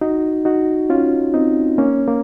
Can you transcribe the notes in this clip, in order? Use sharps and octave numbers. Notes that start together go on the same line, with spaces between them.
D#4 F#4
D#4 F#4
C#4 F4
C4 D#4
A#3 C#4
A#3